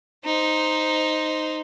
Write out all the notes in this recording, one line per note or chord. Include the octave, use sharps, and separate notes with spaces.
D#4 C5